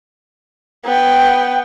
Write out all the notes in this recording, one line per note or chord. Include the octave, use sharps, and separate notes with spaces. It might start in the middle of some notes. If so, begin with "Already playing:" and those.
B3 G5